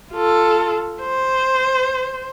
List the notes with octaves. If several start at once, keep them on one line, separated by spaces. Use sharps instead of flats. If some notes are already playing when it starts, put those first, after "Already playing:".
F4 A4
C5